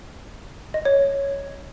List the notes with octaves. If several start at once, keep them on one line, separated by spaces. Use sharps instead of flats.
D#5
C#5